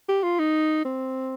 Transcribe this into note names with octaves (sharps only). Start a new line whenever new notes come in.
G4
F4
D#4
C4